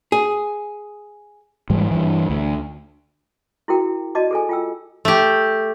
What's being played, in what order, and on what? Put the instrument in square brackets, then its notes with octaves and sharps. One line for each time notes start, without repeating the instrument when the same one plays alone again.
[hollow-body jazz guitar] G#4
[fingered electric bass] G#2 E3 G3
G2 E3
D2
[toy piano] E4 F#4 G#4 A#4 G5
F#4 D5 D#5 A5 D6
G#4 A4 G#5
F4 G5 E6
[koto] A3 G4